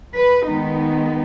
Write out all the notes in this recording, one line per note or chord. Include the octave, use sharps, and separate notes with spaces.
B4
D#3 G#3 B3 D#4